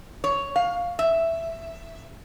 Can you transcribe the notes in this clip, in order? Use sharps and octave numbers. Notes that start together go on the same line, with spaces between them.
C#5
F5
E5